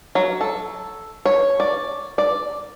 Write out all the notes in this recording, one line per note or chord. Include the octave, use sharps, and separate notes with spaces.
F#3
A4
C#5
D5
D5